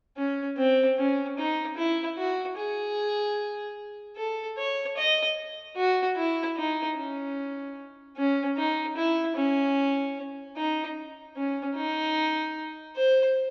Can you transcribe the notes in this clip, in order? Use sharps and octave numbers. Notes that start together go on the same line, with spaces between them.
C#4
C4
C#4
D#4
E4
F#4
G#4
A4
C#5
D#5
F#4
E4
D#4
C#4
C#4
D#4
E4
C#4
D#4
C#4
D#4
C5